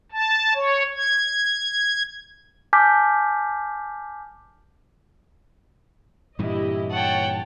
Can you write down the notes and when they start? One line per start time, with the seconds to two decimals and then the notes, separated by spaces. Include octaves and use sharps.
0.12 A5
0.54 C#5
0.97 G#6
2.73 G#5 A5 D6 F6 G6 B6
6.39 G2 A#2 E3 E4 G4 D#5
6.92 C#5 F#5 G5 A5